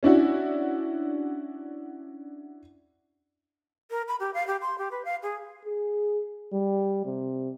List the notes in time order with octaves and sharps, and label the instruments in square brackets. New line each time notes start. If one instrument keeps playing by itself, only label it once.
[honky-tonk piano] C#4 D4 E4 F#4
[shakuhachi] A#4
B5
G4
F5
G4
C6
G4
B4
F5
G#4
[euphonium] G#4
G3
C3